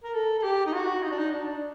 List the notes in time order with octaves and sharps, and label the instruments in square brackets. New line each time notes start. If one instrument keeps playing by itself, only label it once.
[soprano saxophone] A#4
A4
A4
G4
D#4
F#4
D#4
D4
D#4
D4